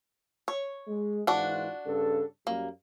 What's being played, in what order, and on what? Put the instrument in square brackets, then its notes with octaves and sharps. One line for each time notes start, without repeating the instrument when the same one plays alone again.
[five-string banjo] C#5
[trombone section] G#3
[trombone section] G#2 E3 F4 [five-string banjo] D4 F#4
[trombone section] G2 C#3 A4
[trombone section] F#2 G3 [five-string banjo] A#3